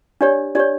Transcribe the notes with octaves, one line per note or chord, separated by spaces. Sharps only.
D4 G4 C#5 D5
D4 G4 C#5 D5